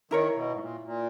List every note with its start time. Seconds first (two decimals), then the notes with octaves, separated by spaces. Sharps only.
0.11 D#3 E4 A#4 C#5
0.35 B2
0.52 G#2
0.60 A#2
0.84 A#2